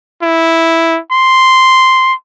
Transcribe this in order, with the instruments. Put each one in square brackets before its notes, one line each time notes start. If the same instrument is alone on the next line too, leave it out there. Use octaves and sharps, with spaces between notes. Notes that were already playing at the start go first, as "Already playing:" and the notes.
[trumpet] E4
C6